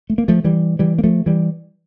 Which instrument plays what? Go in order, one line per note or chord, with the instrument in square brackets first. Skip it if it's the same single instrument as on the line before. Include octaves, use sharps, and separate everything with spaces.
[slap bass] A3
A#3
F3 A3
E3 G3
E3 G3
A#3
F3 A3
E3 G3